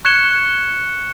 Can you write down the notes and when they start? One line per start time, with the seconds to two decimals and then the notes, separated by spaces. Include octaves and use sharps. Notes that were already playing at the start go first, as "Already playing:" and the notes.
0.05 C#6 F#6 G#6 C#7 E7 G7